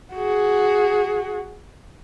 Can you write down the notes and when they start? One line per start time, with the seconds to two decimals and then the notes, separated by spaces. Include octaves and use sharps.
0.14 F#4 G#4